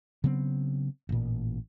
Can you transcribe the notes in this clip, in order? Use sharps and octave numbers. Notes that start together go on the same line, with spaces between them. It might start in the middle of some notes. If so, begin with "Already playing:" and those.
C#3 F#3 B3 C4
A1 A#2